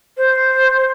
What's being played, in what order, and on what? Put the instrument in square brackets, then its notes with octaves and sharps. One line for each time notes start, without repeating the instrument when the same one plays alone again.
[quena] C5